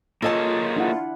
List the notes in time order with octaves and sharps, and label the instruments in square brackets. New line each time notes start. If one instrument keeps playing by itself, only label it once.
[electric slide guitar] A#3 G#4 C#5 [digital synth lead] F4 [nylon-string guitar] A4 D#5 A5
[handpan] D4 E4 F#5